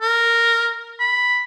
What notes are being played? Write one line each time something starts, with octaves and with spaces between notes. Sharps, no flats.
A#4
B5